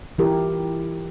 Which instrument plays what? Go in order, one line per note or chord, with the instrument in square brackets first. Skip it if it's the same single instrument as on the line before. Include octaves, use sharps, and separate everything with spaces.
[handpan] E3 G3 E4 F4 G4 A#4